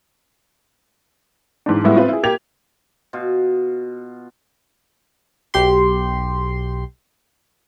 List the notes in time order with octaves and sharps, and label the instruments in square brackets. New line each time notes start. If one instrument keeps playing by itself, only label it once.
[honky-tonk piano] G#2 E3 D4
A2 G3 G#3 B3 E4
C4 F4 B4 C5
E4 G#4
A#3 G4 G#6 F7
[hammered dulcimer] B2 F4
[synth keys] B1 G4 C6